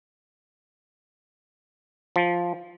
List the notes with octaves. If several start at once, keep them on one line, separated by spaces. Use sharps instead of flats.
F3